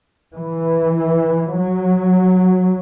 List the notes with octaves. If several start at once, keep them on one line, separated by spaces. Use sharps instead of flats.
E3
F#3